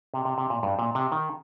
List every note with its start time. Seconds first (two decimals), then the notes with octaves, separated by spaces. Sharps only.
0.14 C3
0.25 C3
0.38 C3
0.50 A#2
0.63 G2
0.79 A#2
0.95 C3
1.12 D#3